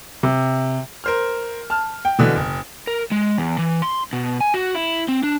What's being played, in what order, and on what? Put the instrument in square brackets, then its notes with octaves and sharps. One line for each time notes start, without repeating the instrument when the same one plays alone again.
[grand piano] C3
A#4 C5 F6
A5 F6
G5
B2 D3 E3
F#1
[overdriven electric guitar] A#4
G#3
E2
E3
C6
B2
G#5
F#4
E4
C4
D4